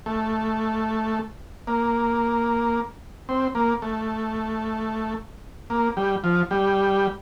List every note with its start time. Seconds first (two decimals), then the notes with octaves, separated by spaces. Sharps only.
0.06 A3
1.67 A#3
3.29 C4
3.55 A#3
3.82 A3
5.70 A#3
5.97 G3
6.24 F3
6.51 G3